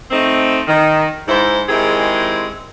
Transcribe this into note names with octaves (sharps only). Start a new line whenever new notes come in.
A3 C4 D#4
D#3
G#2 E4 C5
D#3 G#3 C4 E4 G4 G#4